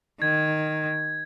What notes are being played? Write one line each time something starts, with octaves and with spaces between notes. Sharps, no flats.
D#3 G#6